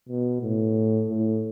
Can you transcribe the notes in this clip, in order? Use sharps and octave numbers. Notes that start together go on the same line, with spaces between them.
B2
A2
A2